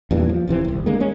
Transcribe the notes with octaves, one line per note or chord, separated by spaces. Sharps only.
E2 G2 A#2 E3
F3
D1 C3 E3 C4
D#1 C2
D3 G#3 A#3
G#3 C#4